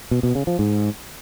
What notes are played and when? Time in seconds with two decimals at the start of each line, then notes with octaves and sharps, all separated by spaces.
0.11 B2
0.23 B2
0.35 C#3
0.47 F3
0.59 G#2